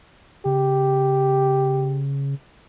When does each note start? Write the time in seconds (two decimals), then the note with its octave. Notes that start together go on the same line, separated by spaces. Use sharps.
0.45 C#3 G4